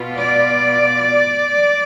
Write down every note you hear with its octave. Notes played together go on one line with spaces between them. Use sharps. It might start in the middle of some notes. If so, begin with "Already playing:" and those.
Already playing: B2 B3 F4
D5